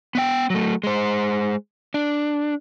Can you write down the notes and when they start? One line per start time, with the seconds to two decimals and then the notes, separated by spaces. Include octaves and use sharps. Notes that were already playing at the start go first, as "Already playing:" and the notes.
0.15 B3 G5
0.50 F#3 A3
0.84 G#3 C5
1.94 D4